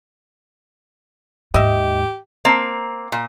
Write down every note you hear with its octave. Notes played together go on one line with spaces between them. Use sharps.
D#2 G#2 G4 D#5 E5
A#3 C4
A#2